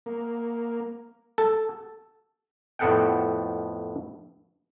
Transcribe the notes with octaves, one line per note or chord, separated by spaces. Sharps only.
A#3
A4
F2 A2 B3 A4 F#5 G5